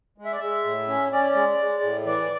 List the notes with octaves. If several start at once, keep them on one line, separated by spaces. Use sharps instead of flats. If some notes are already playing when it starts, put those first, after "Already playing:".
G#3
E5
D5
G#3 E5
A2
C#4
C#4 D5
G#3
G#3
A2
E3 D5